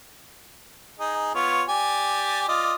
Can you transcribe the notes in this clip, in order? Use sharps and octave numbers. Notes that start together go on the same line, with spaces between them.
D#4 G#4
B3 F4 C#5
G4 D5 G#5
F4 D5 D#5